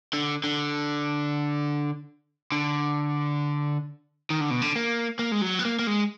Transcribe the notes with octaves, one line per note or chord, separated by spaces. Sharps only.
D3
D3
D3
D#3
D3
B2
D3
A#3
A#3
G#3
F#3
B3
A#3
A#3
G#3